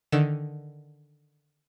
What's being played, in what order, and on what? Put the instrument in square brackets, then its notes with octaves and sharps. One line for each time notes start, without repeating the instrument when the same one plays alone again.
[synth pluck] D3 D#3 E7